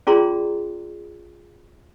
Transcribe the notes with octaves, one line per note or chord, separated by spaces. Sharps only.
C#4 F4 G#4 D5 A#5 C6